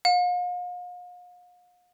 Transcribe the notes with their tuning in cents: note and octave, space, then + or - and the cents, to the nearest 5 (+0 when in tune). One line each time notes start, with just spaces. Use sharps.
F5 +40